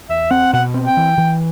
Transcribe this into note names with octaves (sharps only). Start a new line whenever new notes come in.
E2 E5
C4 F#5
B2 F#5
C4
G5
E3
E3